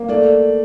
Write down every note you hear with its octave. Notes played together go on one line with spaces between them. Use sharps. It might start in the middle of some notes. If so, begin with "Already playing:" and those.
Already playing: A#3
A3 D5